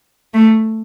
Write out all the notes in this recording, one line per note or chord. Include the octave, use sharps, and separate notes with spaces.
A3